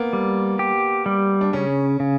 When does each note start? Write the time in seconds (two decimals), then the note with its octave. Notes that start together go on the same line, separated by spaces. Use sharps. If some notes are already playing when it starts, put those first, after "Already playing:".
Already playing: A#3 B3
0.13 G3
0.59 G4
1.06 G3
1.41 D4
1.53 C#3 C#4
2.00 C#3